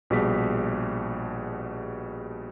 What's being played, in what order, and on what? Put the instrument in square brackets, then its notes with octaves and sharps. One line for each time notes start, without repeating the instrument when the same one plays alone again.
[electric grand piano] A#1 B2 G3 G#4 B6